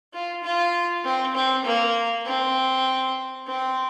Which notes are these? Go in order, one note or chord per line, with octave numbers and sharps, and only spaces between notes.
F4
F4
C4
C4
A#3
C4
C4